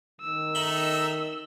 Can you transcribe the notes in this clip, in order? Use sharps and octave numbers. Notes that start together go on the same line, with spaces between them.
D#3 E6
D#4 A4 E5 F#7 G7